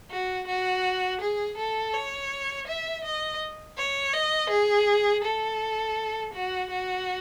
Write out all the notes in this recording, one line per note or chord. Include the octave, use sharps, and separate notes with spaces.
F#4
F#4
G#4
A4
C#5
E5
D#5
C#5
D#5
G#4
A4
F#4
F#4